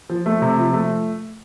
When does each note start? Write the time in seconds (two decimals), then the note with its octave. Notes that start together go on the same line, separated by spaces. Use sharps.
0.10 F3
0.26 A3
0.42 C3
0.58 F3
0.73 A3